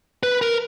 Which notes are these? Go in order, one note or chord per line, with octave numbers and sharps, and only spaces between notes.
B4
A#4